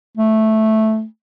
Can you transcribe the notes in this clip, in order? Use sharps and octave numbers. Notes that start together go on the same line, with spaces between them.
A3